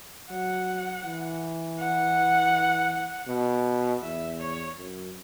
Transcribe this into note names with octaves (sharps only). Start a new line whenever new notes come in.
F#3 F#5
E3
F#5
B2
E2 E5
C#5
F#2